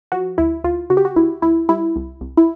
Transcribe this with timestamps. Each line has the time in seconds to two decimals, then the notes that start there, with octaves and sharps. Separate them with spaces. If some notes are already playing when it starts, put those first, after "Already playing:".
0.12 F3 F#4
0.38 D2 E4
0.64 D2 F4
0.90 C#3 F#4
0.97 G4
1.05 F#4
1.16 D2 E4
1.42 D2 E4
1.69 G3 E4
1.96 C2
2.21 C2
2.37 E4